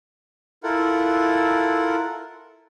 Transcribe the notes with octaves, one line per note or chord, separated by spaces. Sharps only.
E4 F4 A4 A#4 F#5